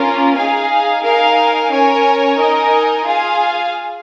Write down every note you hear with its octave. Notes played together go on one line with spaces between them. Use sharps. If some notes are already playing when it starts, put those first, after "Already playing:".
Already playing: A#3 C#4 F4 A#4
D#4 G#4 F5 G#5
D#4 A#4 F5 G#5
C#4 A#4 C#5 G#5
D#4 A#4 D#5 G#5
F4 G#4 F5 G#5